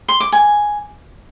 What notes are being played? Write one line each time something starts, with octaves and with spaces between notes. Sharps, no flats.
C6
D6
G#5